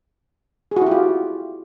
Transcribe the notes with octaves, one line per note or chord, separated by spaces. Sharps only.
G#4
F#4
E4
G4
F4